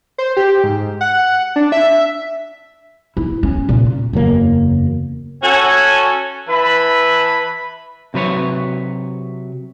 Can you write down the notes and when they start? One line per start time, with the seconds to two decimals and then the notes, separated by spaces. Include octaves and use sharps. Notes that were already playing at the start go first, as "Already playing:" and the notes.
0.18 C5
0.37 G4
0.64 G#2
1.01 F#5
1.56 D4
1.72 E5
3.17 E4
3.43 C#4
3.69 A#2
4.13 F#1 E2 F#3 A#3
5.43 C#4 F#4 A4 G#5
6.49 E3 B4 E5 A5 B5
8.14 C3 F#3 B4 C#5